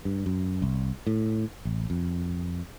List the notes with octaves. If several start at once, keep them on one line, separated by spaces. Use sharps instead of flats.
G2
F#2
C2
A2
A1
F2